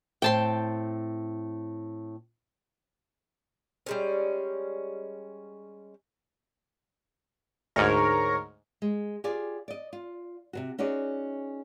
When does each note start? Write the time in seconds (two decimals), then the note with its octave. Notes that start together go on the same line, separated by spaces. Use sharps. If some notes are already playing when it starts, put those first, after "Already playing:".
0.22 A2 C4 G5 A5 C6
3.86 G3 G#3 C#4
7.76 D2 G#2 A#4 C#5
8.82 G#3
9.24 F4 G4 G#4 D5
9.68 D5 D#5
9.93 F4
10.53 C3 D#3 F#4
10.78 C#4 D#4 F#4 G#4 D5